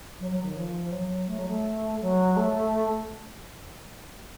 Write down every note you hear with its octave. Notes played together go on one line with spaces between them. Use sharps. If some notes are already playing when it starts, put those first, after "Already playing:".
F#3
F#3
D#3
F3
F#3
A3
F#3
A3
F#3
A3